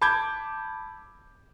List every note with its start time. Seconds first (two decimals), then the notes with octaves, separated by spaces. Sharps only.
0.02 A5 B5 D6 G6 G#6